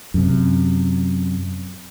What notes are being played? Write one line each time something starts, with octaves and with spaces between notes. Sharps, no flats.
F#2 C3